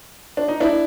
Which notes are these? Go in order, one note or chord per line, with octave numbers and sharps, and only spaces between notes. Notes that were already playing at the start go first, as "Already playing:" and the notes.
D4
D#4
D4 E4